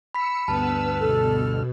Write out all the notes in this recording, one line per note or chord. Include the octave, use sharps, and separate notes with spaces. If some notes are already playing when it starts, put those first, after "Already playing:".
B5 E6 B6 C#7
D2 G2 B3 B4 A5 E6 F6
B2 A4